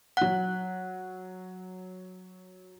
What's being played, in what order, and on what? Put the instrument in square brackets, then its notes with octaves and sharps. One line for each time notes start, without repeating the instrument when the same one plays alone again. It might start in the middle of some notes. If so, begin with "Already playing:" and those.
[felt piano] F#3 F#6 [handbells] F#5